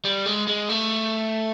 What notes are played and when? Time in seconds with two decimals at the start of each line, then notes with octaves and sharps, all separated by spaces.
0.05 G3
0.26 G#3
0.48 G#3
0.69 A3